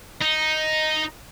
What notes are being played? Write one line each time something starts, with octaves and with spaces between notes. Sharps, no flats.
D#4